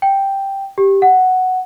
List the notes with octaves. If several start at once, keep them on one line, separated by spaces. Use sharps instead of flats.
G5
G4
F#5